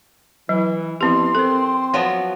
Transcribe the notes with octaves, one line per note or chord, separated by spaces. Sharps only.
E3 F#3
F3 B3 C4 E4 G4 C6
C4 A4 A#4
F3 F#3 B3